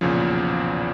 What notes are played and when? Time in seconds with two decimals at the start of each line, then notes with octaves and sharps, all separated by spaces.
0.01 B1 E2 A#2 C#3 F3